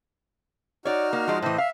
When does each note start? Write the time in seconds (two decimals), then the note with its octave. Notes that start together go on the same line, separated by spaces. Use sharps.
0.85 D#4 F#4 C#5 D5 F6
1.13 A#3
1.28 F3 G#3
1.42 A2 E3 C5 D#5
1.58 E5 F5